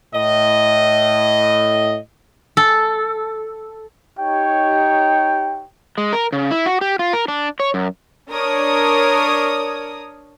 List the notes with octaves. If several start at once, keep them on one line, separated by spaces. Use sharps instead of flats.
A2 D#5
A4
D#4 G4 C#5 G5
G#3
A#4
C#3
E4
F#4
G4
F4
A#4
D4
C#5
F#2
D4 A#4 C#5 D#6